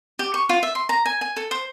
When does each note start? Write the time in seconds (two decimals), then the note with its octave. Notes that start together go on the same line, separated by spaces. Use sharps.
0.19 G4
0.34 C#6
0.49 F4
0.63 E5
0.75 C6
0.89 A#5
1.06 G#5
1.21 G#5
1.36 A4
1.51 C5